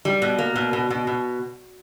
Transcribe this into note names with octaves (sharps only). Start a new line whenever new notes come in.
G3
B2
A#3
B2
B2
B2
B2